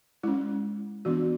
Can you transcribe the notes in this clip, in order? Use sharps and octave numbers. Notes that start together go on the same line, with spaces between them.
G#3 C#4 E4
E3 B3 D4 F#4